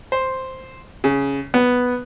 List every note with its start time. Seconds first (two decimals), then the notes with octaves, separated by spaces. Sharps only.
0.12 C5
1.04 C#3
1.54 B3